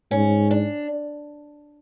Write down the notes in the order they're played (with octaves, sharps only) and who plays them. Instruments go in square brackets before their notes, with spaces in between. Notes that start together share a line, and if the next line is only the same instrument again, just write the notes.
[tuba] G#2 [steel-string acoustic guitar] C#4
[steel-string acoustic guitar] D4